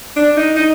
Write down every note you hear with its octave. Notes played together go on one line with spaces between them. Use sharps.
D4
D#4
D#4